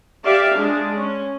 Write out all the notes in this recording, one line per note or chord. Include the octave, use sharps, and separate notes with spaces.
G4 D5 E5 F5
G#3 D4
C#4